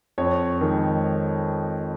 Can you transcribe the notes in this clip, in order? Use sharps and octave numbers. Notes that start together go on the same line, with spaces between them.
F2 C#5
D#3 G#3